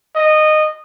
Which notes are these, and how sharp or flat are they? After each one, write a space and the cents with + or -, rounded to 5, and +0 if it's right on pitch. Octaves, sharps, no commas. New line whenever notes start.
D#5 -15